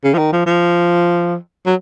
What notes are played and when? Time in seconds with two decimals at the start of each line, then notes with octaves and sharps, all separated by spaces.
0.04 C#3
0.14 F3
0.18 D#3
0.32 F3
0.46 F3
1.66 F#3